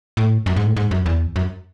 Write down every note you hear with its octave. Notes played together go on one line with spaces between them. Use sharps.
A2
F#2
G#2
A2
G#2
F#2
E2
F#2